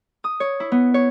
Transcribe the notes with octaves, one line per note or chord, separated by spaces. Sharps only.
D#6
C#5
E4
B3
C#5